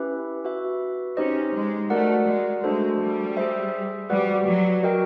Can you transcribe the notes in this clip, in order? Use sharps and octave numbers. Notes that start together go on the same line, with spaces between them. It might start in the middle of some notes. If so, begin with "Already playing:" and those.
Already playing: C#4 E4 G4 B4 E5
F#4 B4 E5
C#4 D#4 G4 C5 D#5
G#3
A3 F#4 A#4 D5 F#5
G#3
G#3 A3 D4 F#4 A4 C5
G3
G#4 C5 E5
G3 F#4 B4 D5 F#5
F#3
F#4 A#4 D#5 G5